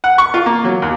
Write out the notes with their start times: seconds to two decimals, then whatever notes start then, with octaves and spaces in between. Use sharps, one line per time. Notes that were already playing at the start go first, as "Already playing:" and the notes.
0.04 F#5
0.18 C#6
0.34 F4
0.46 A#3
0.64 F#3
0.82 D#2